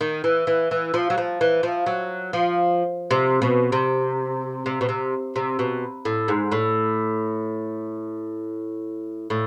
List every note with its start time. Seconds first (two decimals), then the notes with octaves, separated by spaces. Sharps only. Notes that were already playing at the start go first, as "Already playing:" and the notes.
0.01 D#3
0.24 E3
0.47 E3
0.71 E3
0.94 F3
1.10 F#3
1.18 F3
1.41 E3
1.63 F3
1.86 F#3
2.33 F3
3.11 C3
3.42 B2
3.72 C3
4.66 C3
4.81 B2
4.89 C3
5.36 C3
5.59 B2
6.05 A2
6.28 G#2
6.52 A2
9.30 A2